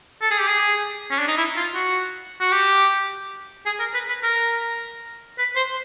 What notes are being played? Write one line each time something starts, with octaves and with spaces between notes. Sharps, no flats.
A4
G#4
G4
G#4
C#4
D4
D#4
E4
F4
F#4
F#4
G4
G#4
A#4
B4
B4
A#4
B4
C5